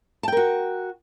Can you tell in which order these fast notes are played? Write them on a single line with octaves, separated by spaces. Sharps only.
A5 G5 A#4 F#4